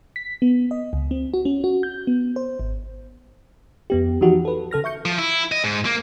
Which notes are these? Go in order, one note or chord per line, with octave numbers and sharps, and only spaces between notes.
B6
B3
D#5
C#2
C4
F#4
C#4
F#4
G6
B3
C5
G#1
F2 B3 G4
E3 F3 D#4 F#4 G4
A4 B4
C#3 A4 F6 A#6
E5 C#6 G6 C#7
F3
E4
D#5
G#2
A#3